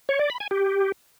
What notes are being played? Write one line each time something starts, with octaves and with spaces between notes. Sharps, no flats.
C#5
D5
B5
G#5
G4